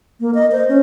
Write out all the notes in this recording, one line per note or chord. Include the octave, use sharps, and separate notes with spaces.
A#3
D#5
C5
C#4